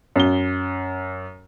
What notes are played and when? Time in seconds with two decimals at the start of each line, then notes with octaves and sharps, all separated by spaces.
0.16 F#2 G7